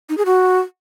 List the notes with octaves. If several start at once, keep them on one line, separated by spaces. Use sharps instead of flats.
D#4
G#4
F#4